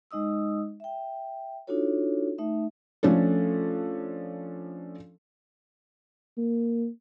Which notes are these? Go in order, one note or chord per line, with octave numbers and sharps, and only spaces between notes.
G#3 D#4 D#5 D#6 E6
E5 G5
D4 D#4 F4 F#4 A4 C#5
A3 D#4 E5
F3 A3 C#4 D4 A4
A#3